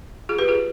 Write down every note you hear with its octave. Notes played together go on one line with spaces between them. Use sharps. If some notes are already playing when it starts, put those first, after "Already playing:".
F4 G#4
G4 B4
F4 G#4